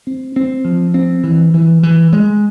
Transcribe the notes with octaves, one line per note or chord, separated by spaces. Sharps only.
C4
C4
F3
C4
E3
E3
E3
G#3